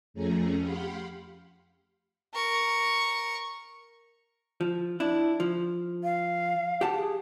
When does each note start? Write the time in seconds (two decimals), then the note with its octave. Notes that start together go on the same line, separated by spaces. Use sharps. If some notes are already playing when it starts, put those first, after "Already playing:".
0.14 F2 F3 A3 C#4 G#4 A#5
0.59 G4 F5 F#5 B5 C6
2.34 A#4 C#6
4.61 F3
5.00 D4 E4
5.40 F3
6.04 F5
6.81 G4 F#5 A5
6.94 G#4